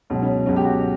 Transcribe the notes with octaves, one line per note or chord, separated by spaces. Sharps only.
C#2 B2 F#3 C#4
C#4
C#2 B2 F#3 C#4
G4
F#4